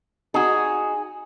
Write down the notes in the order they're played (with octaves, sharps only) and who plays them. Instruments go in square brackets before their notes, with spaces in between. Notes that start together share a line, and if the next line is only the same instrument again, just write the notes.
[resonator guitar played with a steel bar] D#4 F#4 [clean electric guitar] G#4